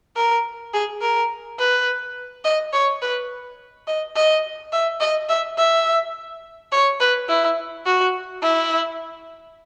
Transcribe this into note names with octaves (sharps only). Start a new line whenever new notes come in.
A#4
G#4
A#4
B4
D#5
C#5
B4
D#5
D#5
E5
D#5
E5
E5
C#5
B4
E4
F#4
E4